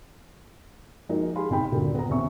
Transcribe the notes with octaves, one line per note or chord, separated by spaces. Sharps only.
F3 G#3 A#3 D#4 F#4
G4 G#4 F5 B5 C6
A1 C3 D#4 G5 B5
D#1 G2 A#2 D3 F#4 A#4
B3 A#5
E1 D#2 C4 C#4 E5 C#6